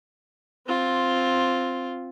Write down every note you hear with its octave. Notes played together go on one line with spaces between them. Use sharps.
C4 F4